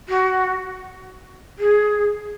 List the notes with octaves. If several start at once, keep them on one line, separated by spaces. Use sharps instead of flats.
F#4
G#4